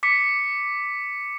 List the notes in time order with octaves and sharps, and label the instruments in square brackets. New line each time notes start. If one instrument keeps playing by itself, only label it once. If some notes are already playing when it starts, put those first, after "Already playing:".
[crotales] D6 B6 C#7